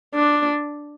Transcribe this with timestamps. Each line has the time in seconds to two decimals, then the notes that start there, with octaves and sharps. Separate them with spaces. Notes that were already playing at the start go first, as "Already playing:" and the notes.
0.15 D4